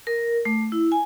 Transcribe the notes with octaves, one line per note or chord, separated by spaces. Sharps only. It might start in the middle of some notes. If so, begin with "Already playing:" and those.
A#4
A3
E4
G#5